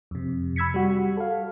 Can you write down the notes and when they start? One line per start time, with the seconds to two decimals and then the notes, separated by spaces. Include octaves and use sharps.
0.11 F2 C3
0.56 B5 E6 G#6 B6 C#7
0.74 G3 F#4
1.17 A4 F5